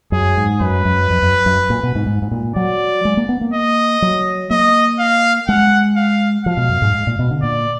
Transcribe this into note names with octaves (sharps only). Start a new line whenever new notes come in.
F#2 G#4
G#2
F#2 B4
F#2
F2
F#2
F#2
A#2
B2
G#2
G#2
G#2
A#2
F#3 D5
G#3
A#3
B3
A#3
D#5
F#3
A#3 D#5
F5
G#3 F#5
F5
F3 F5
B2
F#2
G#2
G#2
A#2
B2
D3
A#2 D5